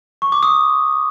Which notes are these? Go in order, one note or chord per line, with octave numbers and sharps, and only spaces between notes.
C#6
D6
D#6